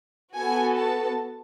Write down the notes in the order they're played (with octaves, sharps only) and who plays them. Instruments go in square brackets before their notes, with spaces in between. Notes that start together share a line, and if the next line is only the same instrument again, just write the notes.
[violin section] B3 F#4 A4 G#5
A5